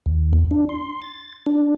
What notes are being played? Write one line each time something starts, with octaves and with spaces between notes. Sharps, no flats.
D#2
E2
D4
C6
A6
D4